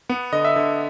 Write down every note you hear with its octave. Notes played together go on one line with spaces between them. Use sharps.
B3 F#5
D3 D#5
E5
D3